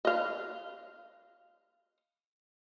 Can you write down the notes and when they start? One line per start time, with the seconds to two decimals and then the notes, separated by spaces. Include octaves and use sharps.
0.05 D#5 F5